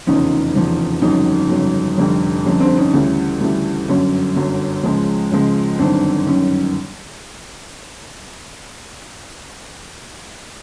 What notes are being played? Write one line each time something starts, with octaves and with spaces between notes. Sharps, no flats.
F1 E2 C#3 F3 C#4 D#4
F1 E2 C#3 F3
G1 F2 C#3 F#3 C#4 D#4
G1 F2 C#3 F#3
F1 F2 D3 G3
F1 F2 D3 G3 C#4
C4 D4
C#4 D#4
D2 C#3 E3 G3 C#4
D2 C#3 E3 G3
G1 F#2 D3 F#3 C#4
G1 F#2 D3 F#3
C#2 C#3 F3 G#3
C#2 C#3 F3 G#3
G1 F#2 D#3 C4 D4
G1 F#2 D#3 C#4